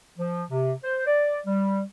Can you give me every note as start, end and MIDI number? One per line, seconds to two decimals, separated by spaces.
0.18 0.44 53
0.50 0.72 48
0.84 1.03 72
1.06 1.38 74
1.46 1.82 55